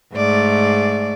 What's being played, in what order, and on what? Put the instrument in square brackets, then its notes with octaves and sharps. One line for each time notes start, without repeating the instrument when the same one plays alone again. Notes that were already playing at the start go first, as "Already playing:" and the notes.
[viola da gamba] G#2 A3 D5